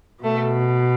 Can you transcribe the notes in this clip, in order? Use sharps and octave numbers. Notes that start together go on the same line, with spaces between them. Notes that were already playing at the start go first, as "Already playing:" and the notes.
B2 A3